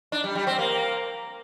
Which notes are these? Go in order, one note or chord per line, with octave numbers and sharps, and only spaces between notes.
D4
G3
G3
C4
A#3